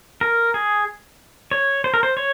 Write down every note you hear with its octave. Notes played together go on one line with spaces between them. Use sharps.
A#4
G#4
C#5
C5
A#4
C5
C#5